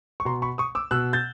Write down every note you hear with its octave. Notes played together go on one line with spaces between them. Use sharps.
C#6
B2 A#5 C6
B5 C#6
C#6 D#6
D6 E6
B2 E6 F#6
G6 A6